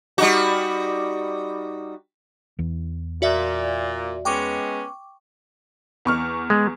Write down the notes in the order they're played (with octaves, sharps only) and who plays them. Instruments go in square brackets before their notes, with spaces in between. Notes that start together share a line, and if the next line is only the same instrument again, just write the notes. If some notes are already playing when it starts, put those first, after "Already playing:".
[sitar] G3 D#4 F#4
[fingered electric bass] E2 E3
[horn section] A#2 [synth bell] F#4 D5 E5
[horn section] G#3 B3 C#4 [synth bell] G5 C#6 D6
[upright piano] E2 C#6 F6
[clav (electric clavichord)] G#3